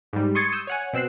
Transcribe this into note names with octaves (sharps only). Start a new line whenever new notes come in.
G#2 G3
C6 C#6 D#6 G#6 A6 C#7
D#6 E6 G6
C#5 F#5 G#5
B2 C4 E6 F#6 C7